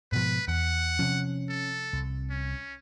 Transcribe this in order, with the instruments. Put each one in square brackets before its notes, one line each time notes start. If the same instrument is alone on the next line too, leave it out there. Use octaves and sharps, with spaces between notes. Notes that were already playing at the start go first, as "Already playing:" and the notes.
[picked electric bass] G#2 B2 F3 [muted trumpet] B4
[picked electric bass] E2 [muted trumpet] F#5
[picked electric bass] C3 F3 [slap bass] C#4
[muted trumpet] A4
[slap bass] C2
[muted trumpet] C#4